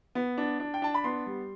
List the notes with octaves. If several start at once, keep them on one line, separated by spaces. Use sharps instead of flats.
B3
D4
D4
G5
D4 A5
B5
B3 C6
G3